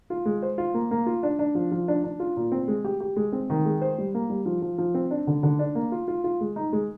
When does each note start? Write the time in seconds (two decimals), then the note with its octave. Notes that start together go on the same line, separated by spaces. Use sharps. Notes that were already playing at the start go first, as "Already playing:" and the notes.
0.10 F4
0.26 G#3
0.42 C5
0.58 F4
0.74 A#3
0.91 A#3
1.06 F4
1.23 D4
1.39 D4
1.55 F3
1.72 F3
1.88 D4
2.04 D4
2.20 F4
2.37 A#2
2.52 C4
2.68 G#3
2.85 G4
3.00 G4
3.16 G#3
3.32 C4
3.50 D#3
3.65 G#3
3.82 C5
3.98 G3
4.14 A#3
4.29 G3
4.46 F3
4.62 F3
4.78 F3
4.94 C4
5.11 D4
5.27 D3
5.43 D3
5.59 D4
5.75 A#3
5.92 F4
6.08 F4
6.24 F4
6.41 G#3
6.56 D#4
6.73 G#3